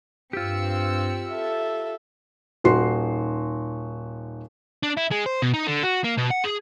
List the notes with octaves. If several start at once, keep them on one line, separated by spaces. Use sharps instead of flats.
G2 C4 F4 G4 E6 C#7
A4 E5
D#1 D#4 F#4 C6 C7
D4
E4
G#3
C5
B2
D#4
D3
F#4
A#3
B2
F#5
G#4